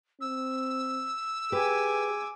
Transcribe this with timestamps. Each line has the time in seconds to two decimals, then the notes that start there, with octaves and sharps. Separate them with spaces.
0.21 C4 E6
1.52 G4 G#4 B4 G#5 D6